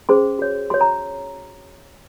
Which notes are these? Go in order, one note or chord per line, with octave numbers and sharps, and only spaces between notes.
C#4 G#4 C5 C6
F#4 C#5
F#4 C#5 C6
A#5